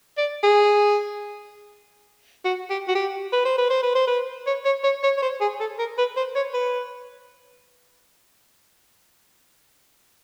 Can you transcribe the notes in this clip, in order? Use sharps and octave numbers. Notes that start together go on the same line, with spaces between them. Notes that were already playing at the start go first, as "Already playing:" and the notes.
D5
G#4
F#4
G4
F#4
G4
B4
C5
B4
C5
B4
C5
B4
C#5
C#5
C#5
C#5
C#5
C5
G#4
A4
A#4
B4
C5
C#5
B4